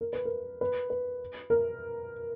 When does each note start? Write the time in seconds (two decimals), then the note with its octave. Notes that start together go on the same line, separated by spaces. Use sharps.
0.01 A#4
0.13 B4
0.25 A#4
0.61 B4
0.90 B4
1.50 A#4